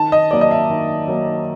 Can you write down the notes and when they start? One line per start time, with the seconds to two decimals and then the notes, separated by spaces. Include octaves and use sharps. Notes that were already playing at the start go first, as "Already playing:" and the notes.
Already playing: D#3 A5
0.12 D#5
0.31 F#3 A#3 D5
0.41 D#5
0.51 E5
0.70 D#3
1.08 F#3 A#3